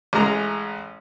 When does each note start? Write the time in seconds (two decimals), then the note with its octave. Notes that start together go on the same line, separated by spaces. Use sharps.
0.13 A1 G#3 A#5